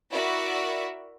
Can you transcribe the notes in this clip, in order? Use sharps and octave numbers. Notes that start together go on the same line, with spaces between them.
E4 F#4 A#4 D5 E5 B5